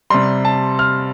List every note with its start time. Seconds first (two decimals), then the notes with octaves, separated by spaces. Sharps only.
0.10 C3 G3 C6
0.45 A5
0.79 F6